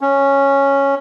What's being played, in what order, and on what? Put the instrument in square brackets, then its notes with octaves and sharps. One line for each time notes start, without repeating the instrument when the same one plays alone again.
[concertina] C#4